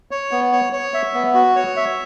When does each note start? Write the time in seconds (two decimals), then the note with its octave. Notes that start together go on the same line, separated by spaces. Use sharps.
0.11 C#5
0.31 B3
0.52 C#5
0.73 C#5
0.94 E5
1.14 B3
1.34 F#4
1.56 C#5
1.76 E5